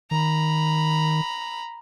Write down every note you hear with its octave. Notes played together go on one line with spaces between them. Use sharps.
D#3 A#5 B5